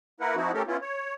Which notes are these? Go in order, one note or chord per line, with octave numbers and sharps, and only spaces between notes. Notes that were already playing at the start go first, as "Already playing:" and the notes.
A#3 E4 A#4 B4 F#5
F3 C4 D#4 E4 F#4
A3 C#4 G4 A4 A#4
B3 C#4 E4 F4
C#5